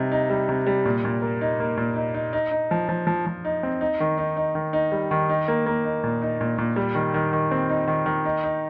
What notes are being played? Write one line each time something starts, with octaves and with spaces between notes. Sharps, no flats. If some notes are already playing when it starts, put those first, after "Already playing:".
Already playing: C3 G3 D#4
D#4
G3
C3
G3
A#2
A#2
A#3
D#4
A#3
A#2
D#4
D#4
D#4
D#4
F3
F3
F3
F3
D#4
C4
D#4
D#3
D#4
D#4
D#3
D#4
G3
D#3
D#4
A#3
A#3
D#4
A#2
D#4
A#2
A#2
G3
D#3
D#3
D#3
C4
D#4
D#3
D#3
D#4
D#4